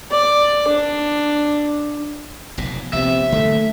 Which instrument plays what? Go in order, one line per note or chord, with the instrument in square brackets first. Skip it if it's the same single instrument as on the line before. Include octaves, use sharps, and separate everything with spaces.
[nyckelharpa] D5
D4
[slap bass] F1 B1 A#2
[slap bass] A#1 F3 B3 [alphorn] C3 [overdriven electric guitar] E5
[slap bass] D3 F#3 A#3 [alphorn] A3